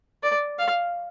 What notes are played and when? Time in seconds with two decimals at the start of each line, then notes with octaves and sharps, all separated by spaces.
0.23 D5
0.59 F5